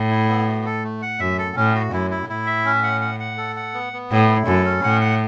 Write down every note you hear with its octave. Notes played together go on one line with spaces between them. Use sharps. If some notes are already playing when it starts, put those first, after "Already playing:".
Already playing: A2
E4
B3
F#4
A4
A3
F#5
F#2 E5
A4
A2 C#4
F#4
F#2 E4
E4
A2 E4
E5
C#4
F#5
F#5
F#5
A4
F#5
B3
B3
A2 E4
E4
F#2 A4
C#4
A2 F#5
F#5